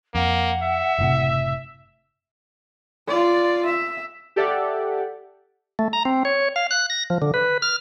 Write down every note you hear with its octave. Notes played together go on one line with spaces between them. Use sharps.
F2 A#3 F#5
E5
F#1 A2 C3
F4 D5
E5
G4 A4 D5 E5 F#5
A3
A#5
C4
C#5
F5
F#6
A#6
F3
D3
B4
F6